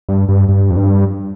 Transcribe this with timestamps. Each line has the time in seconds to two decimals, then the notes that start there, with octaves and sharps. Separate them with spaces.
0.09 G2
0.29 G2
0.49 G2
0.70 F2
0.77 G2